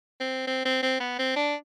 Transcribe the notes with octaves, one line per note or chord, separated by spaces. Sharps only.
C4
C4
C4
C4
B3
C4
D4